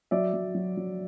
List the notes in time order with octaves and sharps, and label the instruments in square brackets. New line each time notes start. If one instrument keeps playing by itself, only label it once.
[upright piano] F#3 D5 E5
F#3
F#3
F#3